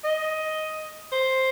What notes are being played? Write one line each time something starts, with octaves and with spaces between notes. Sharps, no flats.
D#5
C5